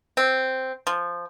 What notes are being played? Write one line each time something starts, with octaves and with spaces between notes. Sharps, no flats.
C4
F3